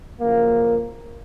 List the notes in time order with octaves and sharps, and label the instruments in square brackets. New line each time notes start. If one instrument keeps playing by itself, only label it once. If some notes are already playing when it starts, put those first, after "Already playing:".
[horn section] F#2 C#3 F3 A#3